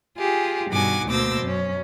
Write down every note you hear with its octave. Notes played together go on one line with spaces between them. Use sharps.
F4 G4 G#4
G2 B2 D#3 F#5 G#5 D6
D2 B2 A#3 C5 D6 E6
F#2 C#4